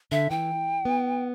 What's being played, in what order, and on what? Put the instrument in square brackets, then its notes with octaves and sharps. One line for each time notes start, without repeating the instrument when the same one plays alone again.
[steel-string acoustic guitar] D3 [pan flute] E5
[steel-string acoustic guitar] E3 [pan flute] G5
[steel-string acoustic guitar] B3